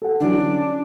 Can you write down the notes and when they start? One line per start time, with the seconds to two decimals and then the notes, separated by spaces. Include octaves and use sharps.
0.02 A4 F#5
0.20 D3 E3 F#3 D4
0.34 C#4